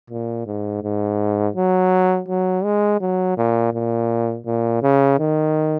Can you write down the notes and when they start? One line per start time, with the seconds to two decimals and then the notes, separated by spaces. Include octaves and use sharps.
0.10 A#2
0.46 G#2
0.83 G#2
1.56 F#3
2.28 F#3
2.64 G#3
3.01 F#3
3.37 A#2
3.73 A#2
4.46 A#2
4.82 C#3
5.19 D#3